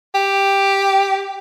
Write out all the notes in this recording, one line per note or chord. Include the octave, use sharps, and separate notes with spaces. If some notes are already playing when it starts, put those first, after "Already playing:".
G4